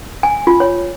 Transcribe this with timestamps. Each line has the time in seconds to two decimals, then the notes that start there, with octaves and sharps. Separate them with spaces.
0.23 G#5
0.47 F4
0.60 C#5